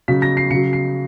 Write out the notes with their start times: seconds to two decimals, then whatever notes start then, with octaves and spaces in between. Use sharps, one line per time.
0.08 C#3 F#3 B6
0.22 A#6
0.37 C7
0.51 C#3 F#3 C#7
0.73 C7